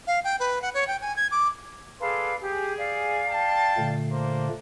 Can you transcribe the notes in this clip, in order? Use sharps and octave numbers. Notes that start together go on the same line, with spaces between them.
F5
G5
B4
F#5
C#5
G5
G#5
G#6
D6
G#4 A4 B4 D5 F5 C6
G4 G#4
D5 F5
G5 A5
A#2 D3 A3
A#3 D4 C5